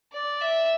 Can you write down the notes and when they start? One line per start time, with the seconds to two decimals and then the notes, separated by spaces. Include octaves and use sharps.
0.13 D5
0.42 E5